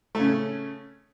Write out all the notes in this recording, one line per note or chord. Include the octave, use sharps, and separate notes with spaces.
C#3 A3 C#4